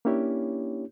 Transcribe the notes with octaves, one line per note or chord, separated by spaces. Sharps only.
A#3 C#4 D4 E4 G4 C#5